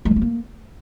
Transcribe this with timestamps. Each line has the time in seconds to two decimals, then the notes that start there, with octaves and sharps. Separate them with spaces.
0.05 G#3
0.11 E3
0.16 A3
0.22 A#3